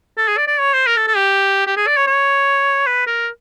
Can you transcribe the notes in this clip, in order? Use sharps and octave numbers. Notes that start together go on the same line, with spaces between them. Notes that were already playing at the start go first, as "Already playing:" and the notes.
A4
G#4
D5
D5
C#5
C5
A#4
A4
A4
G4
G4
G#4
D5
C#5
C#5
B4
A#4